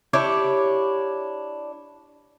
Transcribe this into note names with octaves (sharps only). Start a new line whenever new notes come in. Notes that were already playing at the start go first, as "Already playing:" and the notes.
D4 E4 G4 C#5